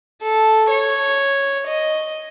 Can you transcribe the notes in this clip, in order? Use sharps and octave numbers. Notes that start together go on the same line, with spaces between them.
A4
C#5
D#5